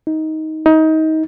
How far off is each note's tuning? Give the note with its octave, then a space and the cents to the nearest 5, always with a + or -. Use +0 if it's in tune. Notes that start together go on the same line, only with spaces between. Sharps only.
D#4 +15
D#4 +25